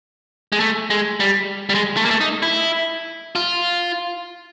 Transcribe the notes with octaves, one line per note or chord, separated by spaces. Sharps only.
G#3
A3
G#3
G3
G3
G#3
A3
A#3
A3
D#4
E4
F4